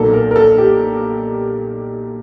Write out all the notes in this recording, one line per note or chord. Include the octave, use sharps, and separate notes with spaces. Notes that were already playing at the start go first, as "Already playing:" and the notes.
Already playing: B1 A#2 F#3 A#3 A4
A#4
A#4
A4
G4